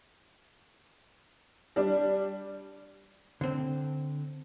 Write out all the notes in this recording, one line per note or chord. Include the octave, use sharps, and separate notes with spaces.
G3 D4
D3 C4